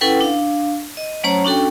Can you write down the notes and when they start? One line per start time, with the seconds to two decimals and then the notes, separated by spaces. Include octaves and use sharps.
0.01 C#4 E4 A4 B4 F#5 G5
0.21 D4 F5
0.97 D#5
1.24 F#3 A3 C#4 C5 C#5 A#5
1.44 C#4 D4 F#4 A4 G5